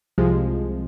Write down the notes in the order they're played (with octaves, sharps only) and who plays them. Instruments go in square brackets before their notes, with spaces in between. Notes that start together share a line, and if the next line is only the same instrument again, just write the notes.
[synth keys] C2 C3 F3 G#3